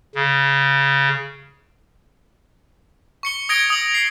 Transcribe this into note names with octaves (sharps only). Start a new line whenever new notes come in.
C#3
C#6 C#7 G7
D#6 G#6 A#6 D7 G7
D#6 F#7
C7